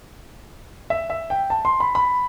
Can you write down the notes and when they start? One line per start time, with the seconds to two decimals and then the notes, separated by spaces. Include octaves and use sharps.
0.90 E5
1.10 E5
1.30 G5
1.50 A5
1.65 C6
1.80 B5
1.95 B5